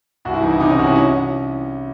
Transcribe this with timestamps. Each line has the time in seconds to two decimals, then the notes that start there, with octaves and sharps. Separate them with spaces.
0.25 C2 F#4
0.34 E4
0.43 E3 D#4
0.51 E4
0.60 C3 D#4
0.70 C#4
0.78 C2 F#4
0.86 E4
0.95 C#4